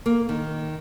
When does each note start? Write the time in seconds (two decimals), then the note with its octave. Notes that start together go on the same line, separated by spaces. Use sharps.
0.06 A#3
0.29 D#3